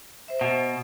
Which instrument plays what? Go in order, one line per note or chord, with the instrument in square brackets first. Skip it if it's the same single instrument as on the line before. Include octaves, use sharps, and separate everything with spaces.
[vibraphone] C5 E5
[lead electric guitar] B2